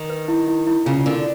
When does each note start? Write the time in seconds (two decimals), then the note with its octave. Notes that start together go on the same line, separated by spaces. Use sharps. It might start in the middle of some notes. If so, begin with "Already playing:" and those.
Already playing: D#3
0.10 B4
0.28 E4
0.48 E4
0.67 E4
0.86 C#3 F4
1.06 D3 A#4